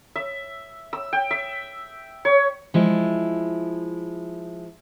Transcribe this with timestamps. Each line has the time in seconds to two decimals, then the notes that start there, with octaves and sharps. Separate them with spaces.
0.15 E5
0.93 E6
1.13 G5
1.31 E5
2.25 C#5
2.74 F3 G#3 E4